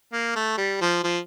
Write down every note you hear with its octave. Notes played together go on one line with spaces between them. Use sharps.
A#3
A3
G3
F3
F3